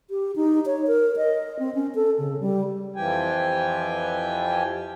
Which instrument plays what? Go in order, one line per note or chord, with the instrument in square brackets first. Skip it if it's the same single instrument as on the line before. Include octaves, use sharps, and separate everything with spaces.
[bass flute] G4
D#4
C#5
A#4
D#5
C4
C#4
A4
C#3
G3
[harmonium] F2 E3 F3 G4 G5 G#5